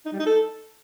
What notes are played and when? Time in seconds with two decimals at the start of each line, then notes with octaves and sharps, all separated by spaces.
0.06 D#4
0.12 G3
0.19 D#4
0.26 A4